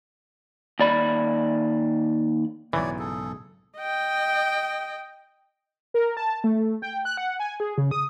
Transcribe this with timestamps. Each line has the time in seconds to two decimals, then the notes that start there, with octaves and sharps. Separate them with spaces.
0.79 D#2 D5 B5
2.73 B1 G#2 C#3 E3 C#5 D5
2.99 G#4 A4
3.79 D#5 G5
5.94 A#4
6.17 A5
6.44 A3
6.82 G5
7.05 F#6
7.17 F#5
7.40 G#5
7.60 G#4
7.78 C#3
7.91 D#6